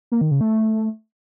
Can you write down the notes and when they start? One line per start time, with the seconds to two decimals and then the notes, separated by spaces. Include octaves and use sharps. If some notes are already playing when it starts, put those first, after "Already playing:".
0.12 A#3
0.21 D#3
0.31 C#3
0.41 A3